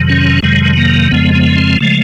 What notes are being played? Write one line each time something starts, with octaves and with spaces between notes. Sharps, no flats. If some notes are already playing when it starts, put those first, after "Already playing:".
Already playing: F2 C3 D#3 F#3
C#4
F2 C3 D#3 F#3 G#3
A#3
F2 C#3 F3 G#3 B3
B3
C4
C#3 F3 G#3 A3